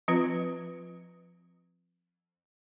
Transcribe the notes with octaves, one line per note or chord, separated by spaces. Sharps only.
F3 C4 F4 B4